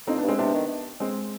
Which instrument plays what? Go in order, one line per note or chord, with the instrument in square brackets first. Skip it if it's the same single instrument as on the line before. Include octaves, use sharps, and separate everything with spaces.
[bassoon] F2 [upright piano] C4 D#4
[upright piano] B3 D4
[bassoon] G2
[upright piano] G#3 C4
[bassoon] C3 [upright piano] B3 D4
[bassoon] D#3
[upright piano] G#3 C4